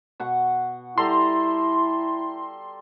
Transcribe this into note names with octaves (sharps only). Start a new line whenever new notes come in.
B2 F#5 C#6
G3 E4 A4 A#5 C6